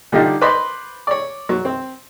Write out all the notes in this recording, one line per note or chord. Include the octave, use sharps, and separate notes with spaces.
D3 G3 D4 D#4 F4 G4
B4 C5 D5 D#5 B5 C6
C#5 D5
F#3
C4